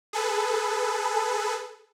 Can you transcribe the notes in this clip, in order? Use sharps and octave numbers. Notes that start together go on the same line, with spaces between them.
G#4 A4 B4